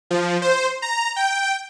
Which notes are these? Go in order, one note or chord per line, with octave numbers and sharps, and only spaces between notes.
F3
C5
A#5
G5